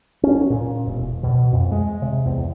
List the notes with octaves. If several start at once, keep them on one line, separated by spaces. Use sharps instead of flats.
C#4
A#2
E1
B2
F2
G#3
C3
E2